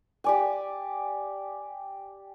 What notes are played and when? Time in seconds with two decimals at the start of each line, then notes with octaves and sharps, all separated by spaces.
0.24 G4 D5 G#5